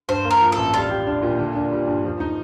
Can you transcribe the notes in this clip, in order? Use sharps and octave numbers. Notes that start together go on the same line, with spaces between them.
G2 C5
A#3
A#4
F3
A1 A4
G3 F4
G4
D4
A#2
D3
D4
G3
G2
F3
D#4